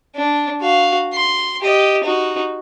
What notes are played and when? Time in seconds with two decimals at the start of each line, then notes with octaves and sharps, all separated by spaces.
0.16 D4
0.61 F#4 F5
1.14 C6
1.62 G4 D#5
2.04 D#4 F#4